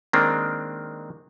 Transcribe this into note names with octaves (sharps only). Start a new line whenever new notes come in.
D#3 G#3 A#3 C4 D4